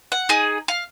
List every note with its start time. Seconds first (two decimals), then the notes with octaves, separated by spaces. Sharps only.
0.12 F#5
0.29 D#4 G#4
0.68 F5